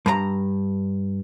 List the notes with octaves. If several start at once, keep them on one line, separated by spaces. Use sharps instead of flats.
G2 B4 A#5